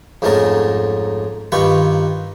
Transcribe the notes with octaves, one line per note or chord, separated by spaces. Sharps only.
F2 G#2 A3 C#4 A#4 A5
G2 D#3 F4 B4 C#6